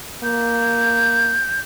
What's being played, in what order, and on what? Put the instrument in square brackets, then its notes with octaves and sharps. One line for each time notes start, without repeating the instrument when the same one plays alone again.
[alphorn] A#3 [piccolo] G6